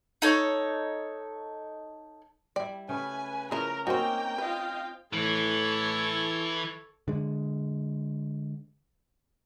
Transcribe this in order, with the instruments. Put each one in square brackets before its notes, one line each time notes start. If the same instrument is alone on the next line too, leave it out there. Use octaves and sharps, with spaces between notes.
[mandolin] D#4 A4 C#5
[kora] G3 E4 [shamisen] D5
[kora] C#3 A3 [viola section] B4 [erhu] G#5
[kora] C#3 [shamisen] F3 E4 G#4 [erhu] A#4
[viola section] A#3 A#5 [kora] C4 C#4 D#4 [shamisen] F#4 C5 [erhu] G5
[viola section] F4 D#5 F5 [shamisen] B4
[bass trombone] A2 [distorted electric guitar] E3 [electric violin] A4 C#5
[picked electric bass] D3 G#3